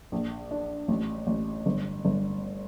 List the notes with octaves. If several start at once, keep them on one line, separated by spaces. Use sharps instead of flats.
A#1
D4
A1
A1
G1
G1